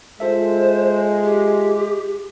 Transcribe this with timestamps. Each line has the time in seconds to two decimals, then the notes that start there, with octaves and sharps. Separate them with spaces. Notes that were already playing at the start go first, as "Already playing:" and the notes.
0.20 G#3 F4 A4 C5 E5
1.24 G4